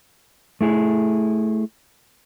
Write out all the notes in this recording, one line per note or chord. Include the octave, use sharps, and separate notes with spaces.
A3 E4 G#4